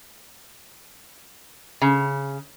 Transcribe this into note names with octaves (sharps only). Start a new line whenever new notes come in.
C#3